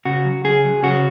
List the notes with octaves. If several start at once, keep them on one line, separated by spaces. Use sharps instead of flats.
C#3 F#4
F#3
C#3 G#4
F#3
C#3 F#4